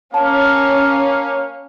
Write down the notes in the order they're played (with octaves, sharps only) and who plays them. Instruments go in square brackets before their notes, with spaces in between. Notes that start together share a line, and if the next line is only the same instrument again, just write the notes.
[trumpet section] A#3 F5 [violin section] C#4 [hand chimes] A5